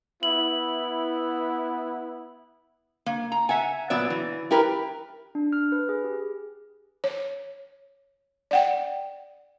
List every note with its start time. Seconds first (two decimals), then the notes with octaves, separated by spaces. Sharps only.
0.23 B3 E4 F#7
3.06 A#3
3.32 A#5
3.49 E5 F#5 G#5
3.90 A#2 F#3 B3 D5 E5
4.10 E3
4.51 E4 G4 A#4 B4
5.35 D4
5.53 F6
5.72 B4
5.89 G#4
6.04 G4
7.04 C#5
8.51 D5 F#5 G5